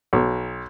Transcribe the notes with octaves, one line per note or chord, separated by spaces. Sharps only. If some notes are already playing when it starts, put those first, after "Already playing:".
B1